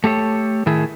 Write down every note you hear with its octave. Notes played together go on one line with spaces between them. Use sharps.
A3 G4 A4 C#5
A2 D#3 A3 E4 G#4